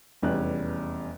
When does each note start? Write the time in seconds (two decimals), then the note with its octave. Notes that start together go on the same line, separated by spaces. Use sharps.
0.22 F1 E2 G3 C#4 F#6